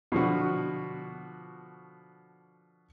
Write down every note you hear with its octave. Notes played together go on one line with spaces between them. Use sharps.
B2 D3 F3 F#4